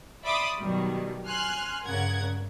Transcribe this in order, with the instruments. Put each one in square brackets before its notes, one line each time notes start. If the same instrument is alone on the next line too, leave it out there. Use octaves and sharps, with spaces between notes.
[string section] D5 E5 B5 C6 D6 D#6
B2 D#3 F#3 G3
G#5 C6 F6 F#6
G2 C#3 A#4 F#5 G#6